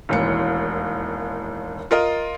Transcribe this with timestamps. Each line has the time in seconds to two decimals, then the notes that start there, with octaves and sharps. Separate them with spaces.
0.09 E1 A1 D#2 E3 C#7
1.91 F4 A#4 D#5